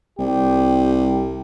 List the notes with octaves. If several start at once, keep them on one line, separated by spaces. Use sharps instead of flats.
C2 G4